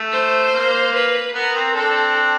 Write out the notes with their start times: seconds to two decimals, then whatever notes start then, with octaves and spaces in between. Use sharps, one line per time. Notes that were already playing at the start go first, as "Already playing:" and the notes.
Already playing: A3
0.12 C5
0.54 A#3
0.94 B4
1.34 B3 A#4
1.55 C4
1.75 C4 D4 A4